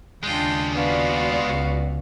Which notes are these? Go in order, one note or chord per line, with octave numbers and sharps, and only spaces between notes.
D#2 C#3 G#3 D4 F4 G5
B3 F#4 D5 F5
C#2